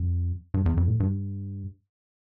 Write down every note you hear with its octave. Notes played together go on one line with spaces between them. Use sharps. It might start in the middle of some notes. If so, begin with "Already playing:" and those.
Already playing: F2
G2
E2
F2
A2
G2